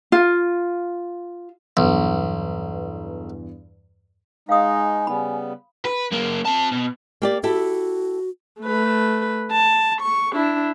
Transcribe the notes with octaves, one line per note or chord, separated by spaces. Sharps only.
F4
B1 E2 G2
G#3 D#4 F5 G#5 D#6
C#3 G3 B3 B5
B4
F#2 A#3
C4 A5
B2
A#3 G4 D5
E4 F#4 G4 A4
A3 B4
A5
C#6
D4 E4